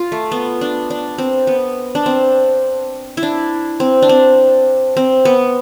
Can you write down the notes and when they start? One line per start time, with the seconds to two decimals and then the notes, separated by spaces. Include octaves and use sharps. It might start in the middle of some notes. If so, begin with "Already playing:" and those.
Already playing: F4
0.12 A3
0.32 B3
0.61 D4
0.90 D4
1.18 C4
1.47 B3
1.95 D4
2.06 C4
3.17 E4
3.23 D4
3.80 C4
4.02 D4
4.09 C4
4.97 C4
5.25 B3